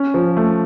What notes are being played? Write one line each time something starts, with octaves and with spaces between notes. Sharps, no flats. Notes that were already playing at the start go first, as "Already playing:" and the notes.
Already playing: C#4
F3
A3